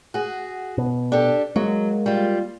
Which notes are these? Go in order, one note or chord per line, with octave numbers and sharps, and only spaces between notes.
F#4 G#4
B2
D4 G4 A4
F#3 G#3 A#3
G3 F4